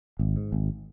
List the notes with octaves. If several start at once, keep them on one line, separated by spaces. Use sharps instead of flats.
G#1
G#2
G#1